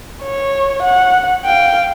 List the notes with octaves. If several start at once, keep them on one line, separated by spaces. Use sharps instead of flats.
C#5
F#5
F5 G5